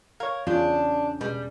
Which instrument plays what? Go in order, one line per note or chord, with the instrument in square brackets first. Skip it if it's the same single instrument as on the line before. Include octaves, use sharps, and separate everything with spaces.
[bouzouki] A#4 [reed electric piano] C#5 F5 [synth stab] G#6
[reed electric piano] E2 G6 [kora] C#3 [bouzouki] D4 [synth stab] F4
[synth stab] B2 G#3 [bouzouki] G3